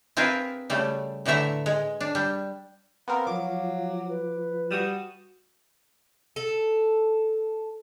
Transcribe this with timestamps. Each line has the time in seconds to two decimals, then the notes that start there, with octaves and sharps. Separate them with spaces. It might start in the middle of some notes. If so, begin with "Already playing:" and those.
0.17 C4 F4 G#4 A#4 B4 E5
0.70 C#3 G3 A3
1.26 A2 D3 E3 A3 E5 A#5
1.66 G#3
2.01 D4
2.15 G3
3.08 B3 C4 A#4 F5
3.27 F3 F#3 D6
4.09 B4
4.71 G3 F#4 D#6 E7
6.36 A4